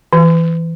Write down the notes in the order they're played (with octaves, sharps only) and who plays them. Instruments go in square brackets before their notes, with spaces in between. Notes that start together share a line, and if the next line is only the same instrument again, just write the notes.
[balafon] E3